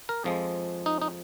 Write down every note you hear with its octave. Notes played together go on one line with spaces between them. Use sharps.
A#4
F2 F3 G#3
D#4
D#4